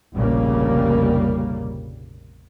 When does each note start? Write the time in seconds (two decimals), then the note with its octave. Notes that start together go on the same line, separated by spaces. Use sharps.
0.14 F1 A#1 C#3 G3 A#3